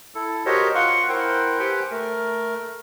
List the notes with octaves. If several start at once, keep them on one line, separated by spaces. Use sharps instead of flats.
E4 A4
F#4 G4 A#4 C5 C#5 D#5
F4 F5 F#5 C6 C#6
E4 A#4 C5 F#5 G5
G4 B4 C5 G5 G#5
A3 A#4